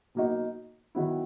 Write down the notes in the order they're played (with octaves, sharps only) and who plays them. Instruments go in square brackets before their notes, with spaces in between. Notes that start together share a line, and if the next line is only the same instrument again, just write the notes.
[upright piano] B2 F#3 A#3 D#4 F#4
D#3 F#3 B3 E4